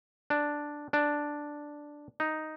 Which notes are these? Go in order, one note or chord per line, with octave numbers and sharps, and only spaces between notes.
D4
D4
D#4